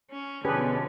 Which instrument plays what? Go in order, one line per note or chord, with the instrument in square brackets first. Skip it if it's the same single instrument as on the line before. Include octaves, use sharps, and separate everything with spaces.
[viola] C#4
[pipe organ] B2 [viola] D3 F3 [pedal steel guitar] C#4 [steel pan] G4 G#4 B4